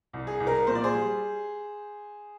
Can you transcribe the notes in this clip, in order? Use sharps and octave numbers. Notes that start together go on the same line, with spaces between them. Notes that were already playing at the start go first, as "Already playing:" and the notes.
C2
G#4
C2
A#4
A#2 C5
D5
G#4 C5
G3